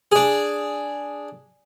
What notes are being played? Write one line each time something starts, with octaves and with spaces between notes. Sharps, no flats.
D4 G#4